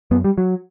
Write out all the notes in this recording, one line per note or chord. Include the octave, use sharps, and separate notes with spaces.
F#2 B3
G3
F#3